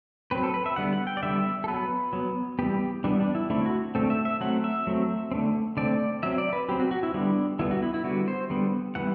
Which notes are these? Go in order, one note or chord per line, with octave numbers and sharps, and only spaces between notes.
F#3 C4 B4
A4
B4
E5
D3 G3 B3 F#5
F#5
G5
D5
D3 G3 B3 E5
A4
F#3 B3 B4
F#3 B3
E3 G3 B3 G4
E3 G3 B3 D4
D4
E4
D3 A3 C4 E4
F#4
D3 A3 C4 A4
E5
E5
F#3 A3 C4 F#5
E5
F#3 A3 C4
D3 A3 C4
D3 A3 C4 D5
F#3 C4 E5
D5
B4
F#3 C4 G4
F#4
F#4
E4
D3 G3 B3 D4
D3 G3 B3 E4
F#4
E4
E4
D3 G3 B3 F#4
C5
D3 G3 B3
E3 G3 B3 F#5